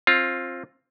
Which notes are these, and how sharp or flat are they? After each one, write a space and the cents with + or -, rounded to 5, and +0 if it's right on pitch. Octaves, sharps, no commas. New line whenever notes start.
C4 +20 F4 +0